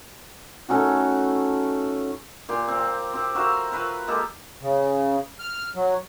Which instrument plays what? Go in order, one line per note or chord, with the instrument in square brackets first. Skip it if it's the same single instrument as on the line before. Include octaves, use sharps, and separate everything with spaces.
[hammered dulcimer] A3 C#4 D#4 F#4
A#2 G4 C6
C4
C4 G4
F#4 A#4 E5 F5
F4 A#4 B4
G#3 A#3 G4 A4
[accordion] C#3
F6
F#3